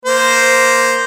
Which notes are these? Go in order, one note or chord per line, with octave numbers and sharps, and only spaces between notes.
A#3 C5